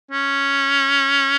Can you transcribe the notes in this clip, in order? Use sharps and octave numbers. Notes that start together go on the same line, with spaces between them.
C#4